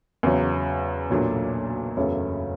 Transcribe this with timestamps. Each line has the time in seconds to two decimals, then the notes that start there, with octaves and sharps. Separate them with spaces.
0.23 E2 C#3 F#3
1.10 B1 A#2 F#3 A3 D4
1.97 F#1 E2 C#3 F#3 A3